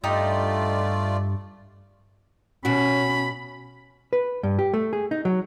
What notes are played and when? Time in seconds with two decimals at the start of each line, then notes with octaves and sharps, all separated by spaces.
0.04 G2 A3 D#4 F4 G4 D5 D#5
2.65 B2 C#4 F#4 B5
4.13 B4
4.43 G2
4.59 G4
4.74 A3
4.93 G#4
5.11 D#4
5.25 F#3